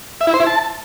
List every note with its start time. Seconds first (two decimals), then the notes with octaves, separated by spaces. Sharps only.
0.21 E5
0.27 E4
0.34 C5
0.40 E4
0.47 A5